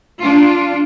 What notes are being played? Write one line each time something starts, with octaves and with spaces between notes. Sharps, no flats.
D4 F4